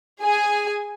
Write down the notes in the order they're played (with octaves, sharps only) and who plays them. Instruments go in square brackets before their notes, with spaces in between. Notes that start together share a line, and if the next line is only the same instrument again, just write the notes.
[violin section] G#4 G#5